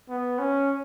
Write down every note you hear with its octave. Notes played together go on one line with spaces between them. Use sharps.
B3
C#4